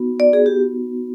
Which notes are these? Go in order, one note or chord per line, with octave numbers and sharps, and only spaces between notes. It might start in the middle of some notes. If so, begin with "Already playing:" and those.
Already playing: B3 D#4 F#4
D5
G#4
G4